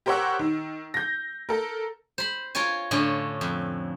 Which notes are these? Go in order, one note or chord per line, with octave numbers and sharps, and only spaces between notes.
G4 A#4 C5 C#5 F#5 E6
D#3
G6 A#6
A4 A#4
C5 B5
F4 A#4 C#5 G#5
A2 D3 C#4 F4
F2